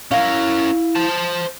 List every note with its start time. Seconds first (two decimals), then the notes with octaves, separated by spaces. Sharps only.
0.11 C#4 E4 A#4 E5 F5
0.95 C5 A5